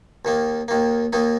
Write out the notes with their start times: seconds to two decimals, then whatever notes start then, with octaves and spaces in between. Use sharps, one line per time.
0.25 D#2 D#3 A#3
0.68 D#2 D#3 A#3
1.13 D#2 D#3 A#3 D#4